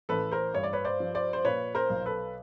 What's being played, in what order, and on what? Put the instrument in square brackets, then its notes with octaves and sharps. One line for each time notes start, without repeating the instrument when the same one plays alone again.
[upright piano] A1 A4 B4
A#4 C5
G2 C#5
D5
B4 C#5
C5 D5
F3
C5 D5
C5
A#2 B4 C#5
A#4 C5
B1
A4 B4